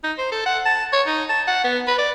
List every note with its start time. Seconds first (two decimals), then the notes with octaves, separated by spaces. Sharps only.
0.04 D#4
0.18 C5
0.31 A4
0.46 F#5
0.66 A5
0.93 C#5
1.07 D#4
1.29 A5
1.47 F#5
1.64 B3
1.87 B4
1.98 D5